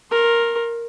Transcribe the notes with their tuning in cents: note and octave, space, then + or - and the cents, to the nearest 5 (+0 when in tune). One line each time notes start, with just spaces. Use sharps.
A#4 +0 C6 +35